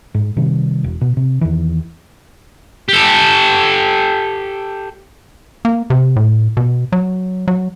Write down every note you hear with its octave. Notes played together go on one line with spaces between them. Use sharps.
G#2
C3 D#3 G3
E1
B2
C3
E2 C3 D#3 E3
G4 A4
A#3
C3
A2
B2
F#3
F#3